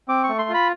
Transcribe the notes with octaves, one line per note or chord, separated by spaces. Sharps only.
C4 D6
C#6
A3
C6
F4
B5